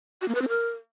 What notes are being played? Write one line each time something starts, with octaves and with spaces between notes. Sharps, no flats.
F#4
A#3
B4
C4
A#4